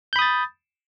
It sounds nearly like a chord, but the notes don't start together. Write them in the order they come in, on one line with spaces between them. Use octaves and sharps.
G6 B5 D#6 A6